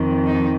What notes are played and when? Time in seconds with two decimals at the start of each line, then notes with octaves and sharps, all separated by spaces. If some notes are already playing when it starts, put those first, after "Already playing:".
Already playing: F2 D#3
0.26 D#4